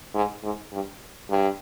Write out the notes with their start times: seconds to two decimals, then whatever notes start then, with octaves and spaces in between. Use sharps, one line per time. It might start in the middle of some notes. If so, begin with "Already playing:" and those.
0.15 G#2
0.44 G#2
0.73 G2
1.31 G2